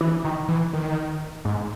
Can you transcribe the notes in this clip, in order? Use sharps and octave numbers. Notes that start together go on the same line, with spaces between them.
E3
D#3
E3
D#3
G#2